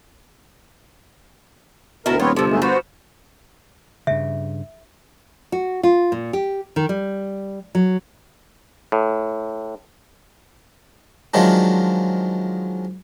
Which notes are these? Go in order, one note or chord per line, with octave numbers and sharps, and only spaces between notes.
D2 B2 E4 F#4 A4 A#4
D#1 B3 C4 F4 C#5
G1 C3 F3 A4
G#2 G#3 A3
F3 B3 F#4 C5
G2 C#3 E5
F#4
F4
A#2
G4
D#3
G3
F#3
A2
D#3 F3 F#3 G#3 D4